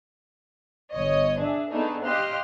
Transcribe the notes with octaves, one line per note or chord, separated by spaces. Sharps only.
G1 C#5 D#5
D4 G#4 E5
A3 B3 D4 D#4 G#4 A4
G4 D#5 F5 C6 F6 F#6